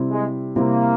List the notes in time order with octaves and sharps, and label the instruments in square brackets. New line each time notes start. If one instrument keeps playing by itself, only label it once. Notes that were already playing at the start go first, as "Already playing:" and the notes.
Already playing: [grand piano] C3 G3 C4 E4
[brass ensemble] G#3
[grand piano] C3 G3 C4 E4 [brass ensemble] A#3